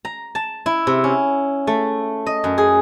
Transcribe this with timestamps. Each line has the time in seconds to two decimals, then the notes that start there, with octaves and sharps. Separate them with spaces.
0.05 A#5
0.35 A5
0.66 E4
0.87 C3
1.04 C#4
1.67 A3
2.26 D#5
2.44 F#2
2.58 G#4